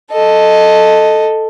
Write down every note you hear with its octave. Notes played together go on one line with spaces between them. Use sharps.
A4 D#5